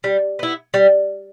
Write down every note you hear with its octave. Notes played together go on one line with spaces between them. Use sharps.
G3
B3 E4
G3